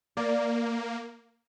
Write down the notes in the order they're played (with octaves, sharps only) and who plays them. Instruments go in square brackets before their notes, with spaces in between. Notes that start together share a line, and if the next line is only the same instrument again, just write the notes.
[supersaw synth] A#3 [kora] D5